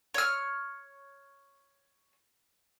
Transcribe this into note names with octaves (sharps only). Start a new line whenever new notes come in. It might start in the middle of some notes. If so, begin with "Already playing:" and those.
C#5 F6